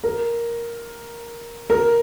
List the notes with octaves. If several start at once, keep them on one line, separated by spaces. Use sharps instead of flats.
A#4
A#4